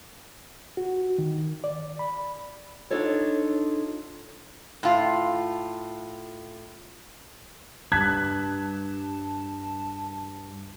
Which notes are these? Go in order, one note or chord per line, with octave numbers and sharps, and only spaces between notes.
F#4
D#3
D5
B5
D4 D#4 F4 A4 C#5
A2 F4
D2 G2 A5 F#6 G#6 B6